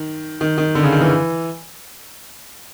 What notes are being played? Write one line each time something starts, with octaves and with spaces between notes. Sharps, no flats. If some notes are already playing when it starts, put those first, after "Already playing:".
Already playing: D#3
D#3
D#3
D3
C#3
D#3
E3